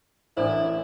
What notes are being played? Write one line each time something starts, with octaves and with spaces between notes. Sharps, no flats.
A1 D4 E4 A4 A#4 C5 D5